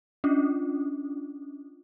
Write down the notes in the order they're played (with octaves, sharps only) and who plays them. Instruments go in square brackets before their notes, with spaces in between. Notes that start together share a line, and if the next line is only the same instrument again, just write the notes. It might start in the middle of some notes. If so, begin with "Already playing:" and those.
[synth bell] C#4 D4 F4